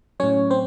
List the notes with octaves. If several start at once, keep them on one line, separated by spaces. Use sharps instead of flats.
A2 F#3 C#4 C#5
C4 C5